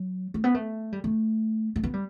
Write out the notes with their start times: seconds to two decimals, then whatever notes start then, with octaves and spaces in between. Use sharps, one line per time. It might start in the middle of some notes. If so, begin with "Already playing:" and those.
Already playing: F#3
0.34 A3
0.44 B3
0.54 A3
0.92 G3
1.04 A3
1.76 A3
1.84 B3
1.94 G3